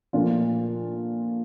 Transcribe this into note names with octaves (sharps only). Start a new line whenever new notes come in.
A#2 F3 A3 D4 F4